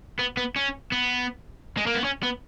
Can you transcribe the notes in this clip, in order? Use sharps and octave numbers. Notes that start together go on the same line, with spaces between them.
B3
B3
C#4
B3
G#3
A#3
B3
C#4
B3